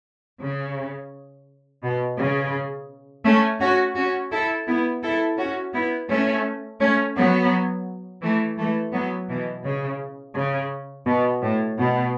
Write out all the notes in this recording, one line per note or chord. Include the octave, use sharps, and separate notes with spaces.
C#3
B2
C#3
A3 C#4
C#4 F#4
C#4 F#4
E4 A4
B3 E4
E4 A4
C#4 F#4
B3 E4
A3 C#4
A3 C#4
F#3 B3
E3 A3
E3 A3
F#3 B3
B2 E3
C#3
C#3
B2
A2
B2